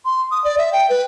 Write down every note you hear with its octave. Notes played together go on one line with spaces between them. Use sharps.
C6
D#6
D5
E5
G5
B4